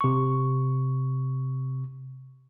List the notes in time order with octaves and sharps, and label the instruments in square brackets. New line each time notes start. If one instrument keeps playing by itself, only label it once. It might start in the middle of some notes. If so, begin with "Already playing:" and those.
[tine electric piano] C3 C#6